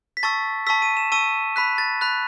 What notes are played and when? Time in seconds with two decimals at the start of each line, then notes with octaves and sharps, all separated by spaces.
0.17 B6
0.23 A5 C#6 E6 A6
0.67 A5 C#6 E6 B6
0.82 D#7
0.97 E7
1.12 A5 C#6 E6 D#7
1.56 B5 F#6 B6
1.78 A6
2.01 B5 F#6